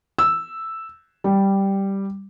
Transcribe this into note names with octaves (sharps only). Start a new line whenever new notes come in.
E6
G3